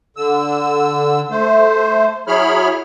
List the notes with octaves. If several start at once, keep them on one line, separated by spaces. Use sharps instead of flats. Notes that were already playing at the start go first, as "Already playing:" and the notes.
D3 E6
A3 C5
F#3 E4 G#4 C#5 B5 F6